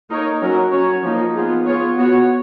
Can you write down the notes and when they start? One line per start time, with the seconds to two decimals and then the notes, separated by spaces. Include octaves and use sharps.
0.10 A#3 D#4 A#4 C#5
0.41 F#3 C#4 F#4 A#4
0.71 C#4 F#4 C#5
1.03 F3 A#3 D#4
1.35 B3 F4 G#4
1.66 B3 F4 G#4 C#5
1.98 B3 F#4 C#5